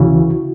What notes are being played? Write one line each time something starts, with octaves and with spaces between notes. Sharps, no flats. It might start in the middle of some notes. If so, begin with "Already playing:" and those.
Already playing: D2 C#3 E3 E4 F#4